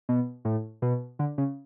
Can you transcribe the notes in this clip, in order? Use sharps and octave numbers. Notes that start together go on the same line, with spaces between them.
B2
A2
B2
D3
C#3